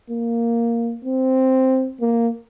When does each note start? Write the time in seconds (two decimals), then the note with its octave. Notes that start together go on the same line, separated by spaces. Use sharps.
0.10 A#3
1.05 C4
2.01 A#3